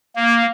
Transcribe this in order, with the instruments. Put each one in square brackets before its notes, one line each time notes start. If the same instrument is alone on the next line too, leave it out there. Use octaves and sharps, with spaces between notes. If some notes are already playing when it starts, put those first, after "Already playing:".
[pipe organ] A#3